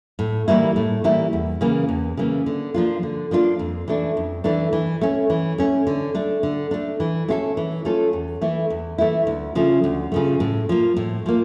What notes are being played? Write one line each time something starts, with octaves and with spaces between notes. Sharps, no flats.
A2
E3 G3 A#3 E4
A2
E3 G3 A#3 E4
E2
C#3 E3 A#3
E2
C#3 E3 A#3
D3
F3 A#3 D4 F4
D3
F3 A#3 D4 F4
F2
E3 A3 D4
F2
E3 A3 D4
E3
A3 C#4
E3
A3 C#4
D3
A3 D4
D3
A3 D4
E3
A3 C#4 F4 A4
E3
A3 C#4 F4 A4
E2
E3 A3 E4
E2
E3 A3 E4
D2
C#3 F3 A3
D2
C#3 F3 A3
A2
F3 A#3
A2
F3 A#3